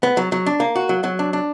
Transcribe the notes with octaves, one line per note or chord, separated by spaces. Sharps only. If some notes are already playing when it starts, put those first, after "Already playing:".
B3
F#3
F#3
D4
A#3
F#4
F#3
F#3
D4
D4